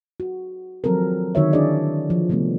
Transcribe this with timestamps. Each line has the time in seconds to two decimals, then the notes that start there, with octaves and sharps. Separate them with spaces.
0.20 F#4
0.84 D#3 F3 F#3 C4 A4 A#4
1.35 D3 D#3 F#4 C#5 E5
1.53 D4 E4 G#4 D5 D#5
2.10 F3
2.29 C3 F3 G3 A3 B3